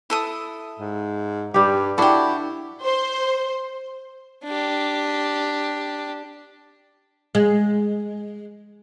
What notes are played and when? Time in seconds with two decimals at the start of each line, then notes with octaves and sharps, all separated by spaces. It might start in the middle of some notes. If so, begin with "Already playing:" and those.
0.10 E4 A4 D#6
0.79 G#2
1.54 G2 G3 G4
1.98 D4 E4 F#4 G4 A4
2.83 C5
4.45 D4 G4
7.35 G#3